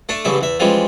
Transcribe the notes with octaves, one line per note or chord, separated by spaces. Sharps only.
A3 D4 A5
A1 G2 C#3 E4 E5
E2 E5
E3 F3 G3 G#3 C#4